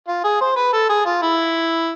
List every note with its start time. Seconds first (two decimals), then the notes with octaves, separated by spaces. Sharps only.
0.08 F4
0.24 G#4
0.41 C5
0.56 B4
0.73 A4
0.89 G#4
1.06 F4
1.22 E4